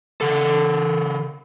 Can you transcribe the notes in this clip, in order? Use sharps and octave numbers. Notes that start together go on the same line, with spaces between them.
C#3 A4